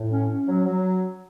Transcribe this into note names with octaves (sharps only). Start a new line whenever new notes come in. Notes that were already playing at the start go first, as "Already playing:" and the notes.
Already playing: A2
C#4
C#4
F#3
F#3